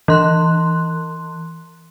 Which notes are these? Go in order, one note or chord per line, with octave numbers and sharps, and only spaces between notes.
E3 C6 F#6